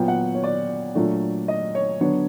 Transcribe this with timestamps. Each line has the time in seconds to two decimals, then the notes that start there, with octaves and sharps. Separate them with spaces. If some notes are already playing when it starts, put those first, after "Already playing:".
Already playing: A#2 F#3 B3 G5
0.08 F#5
0.35 C#5
0.43 D5
0.95 A#2 F#3 A3 D4
1.48 D#5
1.75 C#5
2.00 D3 F#3 B3 D4 C#5